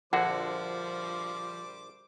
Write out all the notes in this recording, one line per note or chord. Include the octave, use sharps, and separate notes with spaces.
A#1 D3 F3 G3 F#4 C5 F#5 D6